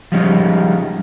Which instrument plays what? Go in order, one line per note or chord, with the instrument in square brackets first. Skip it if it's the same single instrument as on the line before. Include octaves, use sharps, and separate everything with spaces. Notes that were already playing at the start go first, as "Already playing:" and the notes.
[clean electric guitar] F3 G3 G#3 C#4 D#4